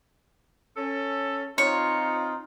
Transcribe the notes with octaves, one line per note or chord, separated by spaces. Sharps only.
C#4 A4
C4 D#4 F4 C#5